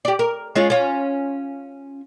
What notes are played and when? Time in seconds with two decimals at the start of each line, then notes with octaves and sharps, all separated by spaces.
0.05 G4 D5
0.19 A#4
0.56 G#3 C#4 F4
0.70 C#4 F4